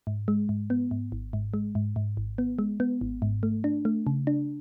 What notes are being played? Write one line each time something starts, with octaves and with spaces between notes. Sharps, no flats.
G#2
G#3
G#2
B3
G#2
G#1
G#2
G#3
G#2
G#2
G#1
B3
G#3
B3
G#1
G#2
A3
D4
A3
C#3
D4